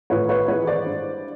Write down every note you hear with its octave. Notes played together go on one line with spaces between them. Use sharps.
A2 B4 C#5
B4 C#5
E3 G#3 B4 C#5
C5 D5
G2